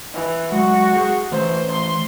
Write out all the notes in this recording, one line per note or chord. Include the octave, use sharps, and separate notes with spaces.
E3
F#3 G#3 F#4
G#4 F#5
E3 A3 C5 C#5
C6